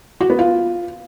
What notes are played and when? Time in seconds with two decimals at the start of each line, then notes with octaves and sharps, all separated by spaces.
0.21 F#4
0.30 B3
0.39 F4